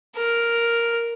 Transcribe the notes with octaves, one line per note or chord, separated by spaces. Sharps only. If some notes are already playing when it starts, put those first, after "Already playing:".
A#4